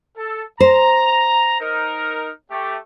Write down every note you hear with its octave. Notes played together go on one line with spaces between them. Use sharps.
A4
C5 A#5
D#4 A#4
A3 G4